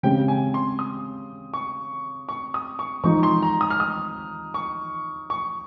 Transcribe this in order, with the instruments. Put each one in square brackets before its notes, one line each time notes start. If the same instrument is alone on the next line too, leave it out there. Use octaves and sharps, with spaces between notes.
[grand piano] C#3 G#3 C4 G4 [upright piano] G5
[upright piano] G#5
C6
D#6
C#6
C#6
D#6
C#6
[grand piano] F3 G#3 D#4 [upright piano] C#6
[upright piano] C6
A#5
D#6
F6
D#6
C#6
C#6